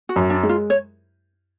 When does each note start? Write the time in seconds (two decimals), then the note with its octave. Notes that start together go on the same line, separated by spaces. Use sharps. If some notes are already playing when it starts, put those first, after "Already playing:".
0.09 F#4
0.16 F#2
0.30 D4
0.43 G#3
0.49 F4
0.70 C#5